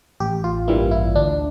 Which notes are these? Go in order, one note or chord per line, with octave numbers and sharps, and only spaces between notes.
A1 G4
F4
G2 E3 G3 A#3 E4
E4
D2 D4